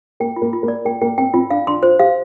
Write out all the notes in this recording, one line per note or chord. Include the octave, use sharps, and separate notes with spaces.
A#3 G5
F4
A#3
F4
A#3
D5
A#3 G5
A#3 G5
C4 G5
C4 F4
D4 F5
D4 C6
F4 C5
G4 F5